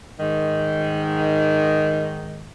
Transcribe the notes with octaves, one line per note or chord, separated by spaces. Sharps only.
G#2 D#3